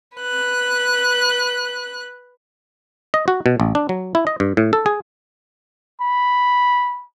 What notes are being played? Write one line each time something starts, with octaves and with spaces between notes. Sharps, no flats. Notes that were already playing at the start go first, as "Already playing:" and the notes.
B4 F#6
D#5
F#4
B2
A1
D4
F#3
E4
D#5
G2
A2
A4
G#4
B5